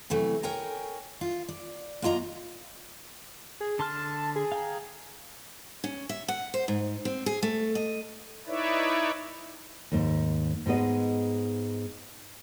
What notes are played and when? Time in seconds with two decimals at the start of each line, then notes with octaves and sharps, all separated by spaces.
0.10 C3 E3 F#3 A3
0.43 A#4 C#5 G5 G#5 A#5
1.21 F4
1.49 D5
2.02 F#2 A#3 F4 D#5 A#5
3.60 G#4
3.79 D3 A5 C6 F6
4.36 G#4
4.52 F5 G5 A#5
5.84 C#4
6.09 E5
6.28 F#5
6.54 C5
6.68 G#2
7.05 C4
7.26 G#4
7.43 A3
7.75 D#5
8.47 D#4 E4 B4 C#5 D5 E5
9.92 D#2 G#2
10.66 G#2 G#3 B3 D#5